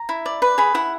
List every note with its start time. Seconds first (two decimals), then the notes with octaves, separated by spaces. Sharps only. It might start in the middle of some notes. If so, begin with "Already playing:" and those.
Already playing: A#5
0.09 E4
0.26 D5
0.42 B4
0.58 G#4 B5
0.74 E4 F#5